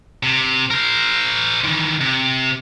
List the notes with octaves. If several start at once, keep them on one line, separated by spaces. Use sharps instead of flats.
C3
A#4 C5
D#3 E3
C3